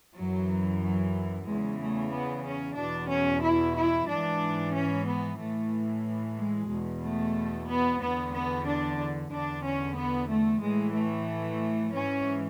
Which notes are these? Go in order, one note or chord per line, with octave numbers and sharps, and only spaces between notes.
F#2 E3 F#3
F#3
E2 C#3 E3 G#3
A3
B3
C#4
E2 B2 D4
C#4
E4
E4
G#2 E3 D4
C#4
B3
A2 E3 A3
G#3
E2 B2
A3
B3
E2 D3 B3
B3
D4
E2 D3 D4
C#4
B3
A3
A2 E3 G#3
A3
G#2 E3 C#4